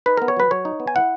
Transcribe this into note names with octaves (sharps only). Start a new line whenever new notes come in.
D#4 B4
B3 A#4
C#5
F#3 B4
F#3 C#5
D#4
B3
G#5
E4 F#5